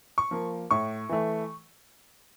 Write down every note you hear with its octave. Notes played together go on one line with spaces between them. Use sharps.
C#6
F3 A#3
A2 C#6
E3 A3